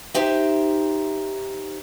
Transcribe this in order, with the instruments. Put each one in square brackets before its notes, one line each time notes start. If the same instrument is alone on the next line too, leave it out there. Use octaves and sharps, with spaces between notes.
[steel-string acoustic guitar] D#4 G4 C5 E5